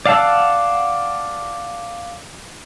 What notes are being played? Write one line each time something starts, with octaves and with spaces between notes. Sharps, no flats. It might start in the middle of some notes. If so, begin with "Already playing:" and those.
D5 F5 F#5 A5 E6